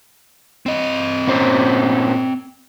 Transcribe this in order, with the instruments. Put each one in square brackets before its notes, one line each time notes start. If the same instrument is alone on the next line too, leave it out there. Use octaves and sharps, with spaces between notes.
[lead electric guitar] C4 D#5
[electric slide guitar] A#2 C#4 C5